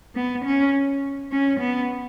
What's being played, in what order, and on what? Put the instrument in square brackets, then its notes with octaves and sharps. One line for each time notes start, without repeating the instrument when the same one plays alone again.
[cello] B3
C#4
C#4
B3